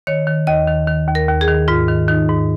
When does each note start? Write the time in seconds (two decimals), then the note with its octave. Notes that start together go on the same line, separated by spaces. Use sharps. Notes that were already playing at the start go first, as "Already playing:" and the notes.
0.07 D#3 C#5
0.27 D#3
0.47 D#2 D#5
0.67 D#3
0.87 D#3
1.08 D#2
1.15 A#4
1.28 D#2
1.41 G#4
1.48 D#3
1.68 G#2 F4
1.88 D#3
2.08 D#3 D#4
2.29 G#2